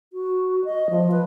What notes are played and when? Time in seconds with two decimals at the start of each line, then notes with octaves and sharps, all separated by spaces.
0.13 F#4
0.65 D#5
0.90 F3
1.12 B4